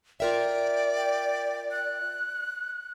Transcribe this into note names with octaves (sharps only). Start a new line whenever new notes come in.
F4 A#4 D5 E5 G5
G5
F#6